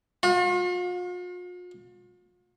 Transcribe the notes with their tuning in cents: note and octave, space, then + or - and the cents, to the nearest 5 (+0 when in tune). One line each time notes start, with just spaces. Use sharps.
F4 +45